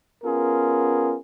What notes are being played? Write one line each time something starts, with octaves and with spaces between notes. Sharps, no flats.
B3 C#4 F4 G#4 A#4